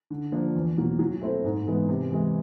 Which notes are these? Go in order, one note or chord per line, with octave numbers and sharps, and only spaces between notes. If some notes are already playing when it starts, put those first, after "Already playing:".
D3
F3 A#3 D4
E2
B2 F#3 A#3
F#3
A3 C4 E4 A4
G#2
E3 G#3 B3
C3
E3 G#3